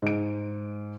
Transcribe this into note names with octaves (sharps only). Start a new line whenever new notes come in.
G#2 D7